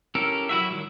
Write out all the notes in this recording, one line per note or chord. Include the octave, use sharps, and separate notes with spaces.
C#4 E4 G4 A4 A#4
F#3 E4 F#4 E5
D#3 F#3 G3